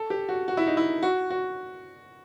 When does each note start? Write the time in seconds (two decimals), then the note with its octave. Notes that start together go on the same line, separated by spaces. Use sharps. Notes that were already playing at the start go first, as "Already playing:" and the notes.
Already playing: A4
0.10 G4
0.29 F#4
0.48 F#4
0.57 E4
0.67 D#4
0.77 E4
1.03 F#4
1.30 F#4